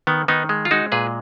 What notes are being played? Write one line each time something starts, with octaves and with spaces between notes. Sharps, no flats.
D#3 B3
D#3 B3 D#4
G#3
F4
G#3 D#4 F#4
A#2 G#4 B4